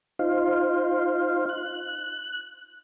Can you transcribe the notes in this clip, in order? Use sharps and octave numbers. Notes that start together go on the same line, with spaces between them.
D#4 F4 C5 F5
F#6